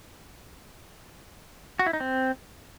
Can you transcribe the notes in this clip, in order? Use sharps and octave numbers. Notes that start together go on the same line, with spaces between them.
F#4
E4
D#4
C4